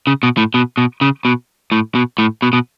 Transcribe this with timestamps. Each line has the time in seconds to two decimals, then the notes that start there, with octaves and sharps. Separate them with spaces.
0.07 C#3
0.23 B2
0.37 A2
0.54 B2
0.77 B2
1.01 C#3
1.25 B2
1.72 A2
1.95 B2
2.18 A2
2.42 B2
2.53 B2